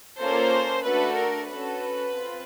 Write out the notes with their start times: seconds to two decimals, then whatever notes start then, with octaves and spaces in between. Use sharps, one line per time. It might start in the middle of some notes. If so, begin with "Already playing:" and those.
0.19 A#3 C#4 F4 A4 C5
0.84 A3 D4 F#4 A4 B4
1.16 A#4
1.48 C#4 F#4 A4 B4
2.14 C4 F4